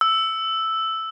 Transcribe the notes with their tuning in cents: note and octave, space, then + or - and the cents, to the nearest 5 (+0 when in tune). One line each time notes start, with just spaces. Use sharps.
E6 +0